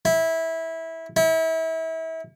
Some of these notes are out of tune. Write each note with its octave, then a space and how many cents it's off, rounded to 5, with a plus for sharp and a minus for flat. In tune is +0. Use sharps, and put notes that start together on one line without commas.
E4 -15
E4 -30